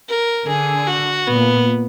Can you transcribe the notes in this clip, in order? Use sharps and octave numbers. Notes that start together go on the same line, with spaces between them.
A#4
D3 G#4
F#4
A#2 B3